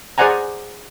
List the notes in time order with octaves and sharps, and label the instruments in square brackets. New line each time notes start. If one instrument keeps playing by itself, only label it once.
[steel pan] G#4 C5 D5 F#5 G#5 A#5